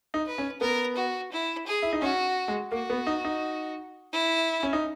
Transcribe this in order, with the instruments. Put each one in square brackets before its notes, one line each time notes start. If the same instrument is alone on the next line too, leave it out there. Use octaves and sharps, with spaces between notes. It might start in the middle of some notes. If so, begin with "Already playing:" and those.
[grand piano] D#4
[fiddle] B4
[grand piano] C#4
[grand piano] B3 [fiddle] A#4
[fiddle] F#4
E4
G#4
[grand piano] E4
D#4
[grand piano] C#4 [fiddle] F#4
[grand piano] G#3
[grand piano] A#3 [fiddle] F#4
[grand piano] B3
D#4
D#4
[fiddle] E4
[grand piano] C#4
D#4